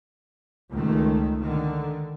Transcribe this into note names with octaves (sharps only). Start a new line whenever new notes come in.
C#2 D#3 A3
D3 D#3